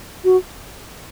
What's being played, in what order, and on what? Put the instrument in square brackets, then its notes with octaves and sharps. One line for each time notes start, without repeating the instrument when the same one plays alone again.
[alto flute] F#4